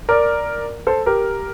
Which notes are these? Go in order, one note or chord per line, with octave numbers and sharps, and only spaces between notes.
A#4 D5
A4 C5
G4 A#4